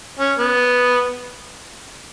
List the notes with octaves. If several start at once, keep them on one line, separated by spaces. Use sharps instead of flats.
C#4
B3